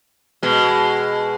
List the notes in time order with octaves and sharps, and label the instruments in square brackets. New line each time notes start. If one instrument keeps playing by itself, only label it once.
[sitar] B2 G#3